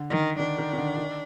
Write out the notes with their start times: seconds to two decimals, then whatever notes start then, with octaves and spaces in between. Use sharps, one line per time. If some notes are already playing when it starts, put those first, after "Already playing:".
Already playing: D3
0.10 D#3
0.39 D#3 D4
0.58 D#3
0.73 D#3
0.78 D3
0.97 D#3